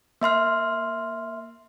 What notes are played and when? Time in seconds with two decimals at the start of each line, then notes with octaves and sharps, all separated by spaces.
0.22 A#3 E5 C6 F6